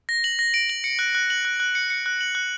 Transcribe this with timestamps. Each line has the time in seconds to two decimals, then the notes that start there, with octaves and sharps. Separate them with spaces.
0.09 A#6
0.24 F#7
0.39 A#6
0.54 D7
0.69 F#7
0.84 C#7
0.99 F#6
1.15 F#6
1.30 F#7
1.45 F#6
1.60 F#6
1.75 C#7
1.90 C#7
2.06 F#6
2.21 F#7
2.35 F#6